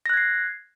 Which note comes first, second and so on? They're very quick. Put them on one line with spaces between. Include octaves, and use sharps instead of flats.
A#6 F#6 G#6 C7